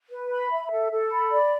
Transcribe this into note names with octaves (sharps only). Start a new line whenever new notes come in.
B4
B5
E5
A4
A4
B5
D5